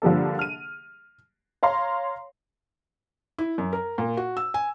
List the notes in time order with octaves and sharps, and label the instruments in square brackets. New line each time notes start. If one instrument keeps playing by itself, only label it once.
[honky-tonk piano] D3 F3 G3 A#3 A4
F6 D#7
C#5 F5 A#5 C6
[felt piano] E4
F#2
A#4
A#2
F#4
E6
G#5